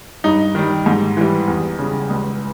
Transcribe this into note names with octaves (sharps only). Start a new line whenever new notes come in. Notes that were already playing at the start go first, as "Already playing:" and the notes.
G2 D#4
D#3 G3
G#2
E3 G3
E2
C#3 G3
C#2